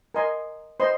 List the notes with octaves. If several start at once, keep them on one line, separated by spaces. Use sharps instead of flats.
A#4 D#5 G#5 C6
C5 D#5 C6